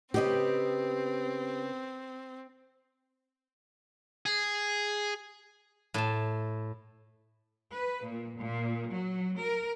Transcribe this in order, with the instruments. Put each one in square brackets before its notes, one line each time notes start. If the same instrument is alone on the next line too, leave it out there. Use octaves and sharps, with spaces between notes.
[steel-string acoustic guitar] C#3 B3 B4 [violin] C4 [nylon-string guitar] G4 D#5
[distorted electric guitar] G#4
[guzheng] A2 A5
[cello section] B4
A#2
A#2
F#3
A#4